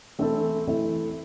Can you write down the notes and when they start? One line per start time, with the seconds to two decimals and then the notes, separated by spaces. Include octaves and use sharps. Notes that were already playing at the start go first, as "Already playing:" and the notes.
0.19 E3 A3 C4 E4 A4
0.67 E3 A3 C4 E4 A4